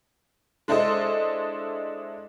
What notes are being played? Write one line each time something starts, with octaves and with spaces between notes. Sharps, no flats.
G#3 D4 E4 A4 C5 D#5